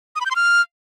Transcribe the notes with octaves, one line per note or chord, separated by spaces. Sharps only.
D#6
B5
G6
C6
F6